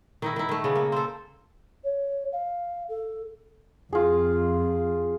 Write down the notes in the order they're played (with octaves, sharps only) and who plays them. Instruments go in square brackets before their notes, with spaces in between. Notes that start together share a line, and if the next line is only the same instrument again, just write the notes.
[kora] D#3 D#4 E4
D#3 E4
D#3 A3
C#3 B3
A#3
C4 A4
[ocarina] C#5
F5
A4
[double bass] F2 [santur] F4 G#4